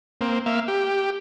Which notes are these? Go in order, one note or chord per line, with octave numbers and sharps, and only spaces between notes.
A#3 C4
A#3 E5 F5
G4